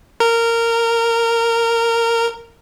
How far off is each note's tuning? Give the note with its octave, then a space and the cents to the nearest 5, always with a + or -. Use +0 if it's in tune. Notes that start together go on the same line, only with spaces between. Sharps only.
A#4 -15